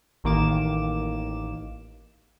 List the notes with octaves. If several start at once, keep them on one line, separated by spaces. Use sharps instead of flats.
A1 D#3 A#3 D6 E7